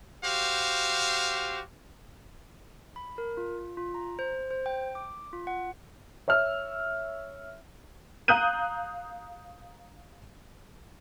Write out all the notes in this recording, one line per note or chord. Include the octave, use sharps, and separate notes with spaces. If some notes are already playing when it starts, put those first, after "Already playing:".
F#4 G4 C5 F5
B5
A#4
F4
F4
A#5
C5
C5
G5
D6
F4
F#5
C#5 E5 E6 F6
F5 A#5 D#6 F#6 G6 D#7